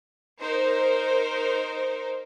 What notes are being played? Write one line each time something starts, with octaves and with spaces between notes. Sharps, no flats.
D#4 A#4 C5